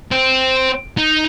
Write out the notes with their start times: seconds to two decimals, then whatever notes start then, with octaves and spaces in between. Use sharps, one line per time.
0.11 C4
0.97 D#4